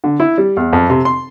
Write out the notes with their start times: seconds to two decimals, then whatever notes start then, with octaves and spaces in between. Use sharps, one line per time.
0.04 D3
0.20 E4
0.38 G3
0.57 E2
0.73 F2
0.90 C3
1.05 C6